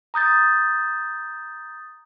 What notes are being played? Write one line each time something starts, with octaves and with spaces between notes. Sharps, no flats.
A#5 D#6 G6 A6